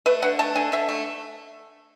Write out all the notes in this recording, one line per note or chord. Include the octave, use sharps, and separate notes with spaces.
A3 B4
D3 F#5
A3 A5
D3 G#5
D3 E5
A3